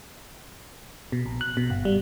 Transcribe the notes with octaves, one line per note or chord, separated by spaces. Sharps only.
B2
A#1
F#6
B2
G1
G3